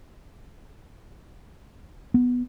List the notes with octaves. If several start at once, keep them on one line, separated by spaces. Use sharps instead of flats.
B3